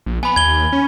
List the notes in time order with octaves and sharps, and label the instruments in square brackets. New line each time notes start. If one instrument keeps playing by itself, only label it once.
[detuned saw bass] A#1
[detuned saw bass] B3 [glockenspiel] G#5 B5
[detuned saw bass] D#2 [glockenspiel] G#6 G7
[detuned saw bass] C#4